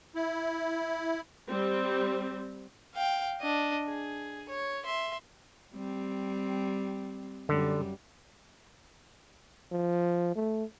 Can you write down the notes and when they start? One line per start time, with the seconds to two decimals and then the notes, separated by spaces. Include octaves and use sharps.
0.15 E4
1.49 G3 C4
2.94 F5 G5
3.41 D4 D#5
3.86 G#4
4.49 C#5
4.84 E5 C6
5.74 G3 C4
7.49 F#2 D3 G3
9.72 F3
10.36 A3